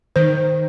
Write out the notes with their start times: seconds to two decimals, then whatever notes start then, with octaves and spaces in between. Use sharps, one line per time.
0.16 D#3 C5